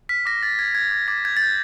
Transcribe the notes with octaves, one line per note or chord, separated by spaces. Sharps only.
F6 B6
D6 A#6
D6 A6
F6 G#6
F6 G#6
D6
D6 A6
G6 G#6
G6 A6